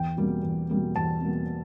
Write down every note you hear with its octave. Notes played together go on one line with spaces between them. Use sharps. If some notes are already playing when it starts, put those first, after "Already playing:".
Already playing: E2 G5
B2 G3 A#3
E2
B2 G3 A#3
E2 A5
B2 G3 A#3